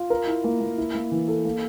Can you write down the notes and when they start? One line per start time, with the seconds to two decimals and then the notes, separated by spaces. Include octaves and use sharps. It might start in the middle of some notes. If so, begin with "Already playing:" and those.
Already playing: F4
0.10 A#4
0.27 E4
0.44 A#3
0.61 A#3
0.78 E4
0.95 A#3
1.12 E3
1.28 A4
1.45 A#3